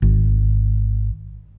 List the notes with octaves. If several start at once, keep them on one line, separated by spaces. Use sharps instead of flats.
G#1